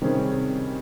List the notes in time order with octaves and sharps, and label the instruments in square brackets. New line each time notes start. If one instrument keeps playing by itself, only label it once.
[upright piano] C3 [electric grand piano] D#3 G3 C#4 G#4